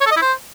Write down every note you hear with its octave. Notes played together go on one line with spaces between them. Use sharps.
C#5
A4
D#5
E4
C5